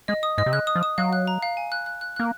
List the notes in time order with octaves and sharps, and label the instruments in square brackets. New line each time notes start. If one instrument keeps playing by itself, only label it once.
[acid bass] G#3 [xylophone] D#5
[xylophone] D#6
[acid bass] G#2 [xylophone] D#5
[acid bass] C3
[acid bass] C#3 [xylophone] F#6
[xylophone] D#6
[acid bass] F3
[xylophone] D#6
[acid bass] F#3 [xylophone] F5
[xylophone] F#6
A#5
F5
G#5
F#6
F#6
F#6
[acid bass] A#3 [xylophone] F#6